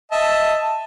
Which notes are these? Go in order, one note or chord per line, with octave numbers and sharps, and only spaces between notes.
D#5 E5 A5